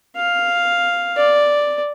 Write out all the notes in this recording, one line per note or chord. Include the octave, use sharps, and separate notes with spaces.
F5
D5